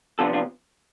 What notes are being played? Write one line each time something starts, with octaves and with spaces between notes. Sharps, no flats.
C3 F3 B3 D4 F4 A4
D4 F4